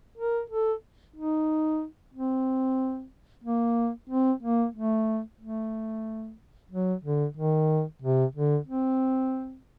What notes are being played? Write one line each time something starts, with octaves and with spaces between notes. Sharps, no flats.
A#4
A4
D#4
C4
A#3
C4
A#3
A3
A3
F#3
D3
D#3
C3
D3
C4